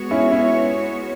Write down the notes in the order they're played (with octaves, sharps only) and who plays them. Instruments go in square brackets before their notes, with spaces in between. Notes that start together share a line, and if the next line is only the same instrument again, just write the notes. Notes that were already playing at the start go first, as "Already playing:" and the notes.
Already playing: [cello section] G#3 B3 F#4 C#5
[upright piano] C#4 E4
C#4 E4